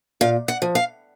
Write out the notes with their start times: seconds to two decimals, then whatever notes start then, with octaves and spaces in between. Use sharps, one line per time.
0.21 A#2 F5
0.48 F#5
0.62 F3
0.75 F5